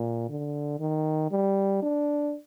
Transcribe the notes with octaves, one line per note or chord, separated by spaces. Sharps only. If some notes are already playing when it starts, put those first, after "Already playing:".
Already playing: A#2
D3
D#3
G3
D4